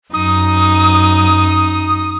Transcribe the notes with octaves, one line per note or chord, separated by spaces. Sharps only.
F#2 D#4 D#6